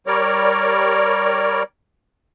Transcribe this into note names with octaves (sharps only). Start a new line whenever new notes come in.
G3 A#4 C#5 D5